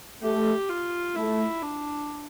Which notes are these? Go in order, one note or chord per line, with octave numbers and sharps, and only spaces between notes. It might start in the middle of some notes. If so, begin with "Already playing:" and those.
A3 G4
F4
A3 E4
D4